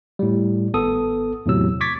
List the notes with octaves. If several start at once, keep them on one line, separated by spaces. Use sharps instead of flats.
A2 G3
G#1 B3 A4 D#6
E2 A2 C3 F#3 E6
C#6 D6 G#6 A6 B6